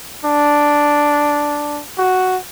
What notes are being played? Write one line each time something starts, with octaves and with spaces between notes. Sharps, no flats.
D4
F#4